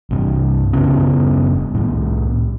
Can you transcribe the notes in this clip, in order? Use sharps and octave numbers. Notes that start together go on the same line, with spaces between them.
C2 G2
F#1 C#3 B3 C#4
C2 A2